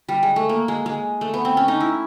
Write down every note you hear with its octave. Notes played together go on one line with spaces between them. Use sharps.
G3
G#3
A3
A#3
G#3
G#3
A3
B3
C4
C#4
D#4
E4